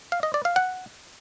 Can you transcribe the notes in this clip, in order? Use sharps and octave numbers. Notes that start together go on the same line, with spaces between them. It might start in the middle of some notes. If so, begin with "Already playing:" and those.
F5
D#5
D5
F5
F#5